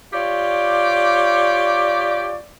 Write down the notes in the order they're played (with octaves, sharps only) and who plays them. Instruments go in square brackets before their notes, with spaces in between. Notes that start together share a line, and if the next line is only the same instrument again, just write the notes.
[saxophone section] F4 G4 C#5 D5